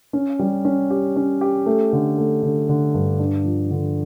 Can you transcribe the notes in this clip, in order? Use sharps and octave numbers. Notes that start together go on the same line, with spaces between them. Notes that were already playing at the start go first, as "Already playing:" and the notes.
C#4
G3
C#4
G4
C#4
G4
A3
D3
A3
D3
D3
G2
D4
F3
D3